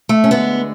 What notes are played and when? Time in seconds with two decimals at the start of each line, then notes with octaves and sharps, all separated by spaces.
0.09 A3
0.24 C#4
0.31 D2 D3 G#3 B3